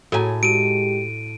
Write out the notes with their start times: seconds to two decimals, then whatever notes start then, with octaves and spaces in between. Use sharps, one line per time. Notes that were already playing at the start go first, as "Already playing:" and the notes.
0.12 A2 F#4 C#5 G#5 A#5
0.43 G#3 F#4 G4 D7 D#7